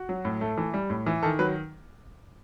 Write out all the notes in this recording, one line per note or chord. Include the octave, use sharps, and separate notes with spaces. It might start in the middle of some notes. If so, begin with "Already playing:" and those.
Already playing: F#4
F#3
A2
A3
E3
G3
A2
E3
D#3 A4
F#3 B4